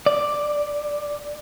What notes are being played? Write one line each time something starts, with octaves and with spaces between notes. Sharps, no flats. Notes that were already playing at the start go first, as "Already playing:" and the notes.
D5